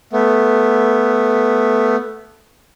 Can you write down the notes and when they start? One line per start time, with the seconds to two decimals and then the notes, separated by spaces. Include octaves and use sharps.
0.13 A3 B3